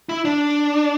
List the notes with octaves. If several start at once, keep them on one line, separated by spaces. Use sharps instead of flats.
E4
D4